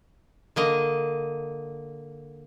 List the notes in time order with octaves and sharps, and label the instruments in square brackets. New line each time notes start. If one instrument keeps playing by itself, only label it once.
[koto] D3 A#3 D#5